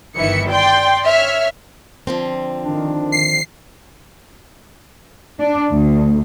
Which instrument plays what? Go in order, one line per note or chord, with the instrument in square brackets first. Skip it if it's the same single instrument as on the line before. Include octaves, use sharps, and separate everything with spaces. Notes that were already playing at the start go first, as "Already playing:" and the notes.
[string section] G1 D#3 E3 E5 C#7
D5 G5 C6
C#5 E5 F6
[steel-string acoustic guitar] D3 F3 C4
[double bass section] D#3 [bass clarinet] D4
[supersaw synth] C7
[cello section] D4
D2